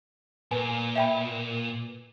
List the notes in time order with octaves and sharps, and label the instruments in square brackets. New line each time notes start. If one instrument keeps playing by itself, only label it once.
[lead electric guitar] A#2 [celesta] B4 [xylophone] G#5
[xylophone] E5 G5 B5